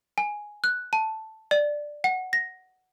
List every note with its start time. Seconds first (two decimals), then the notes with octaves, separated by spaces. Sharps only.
0.18 G#5
0.64 F#6
0.93 A5
1.51 D5
2.04 F#5
2.33 A#6